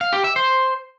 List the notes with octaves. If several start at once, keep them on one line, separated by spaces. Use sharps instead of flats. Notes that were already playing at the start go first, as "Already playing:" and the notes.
F5
G4
E5
C5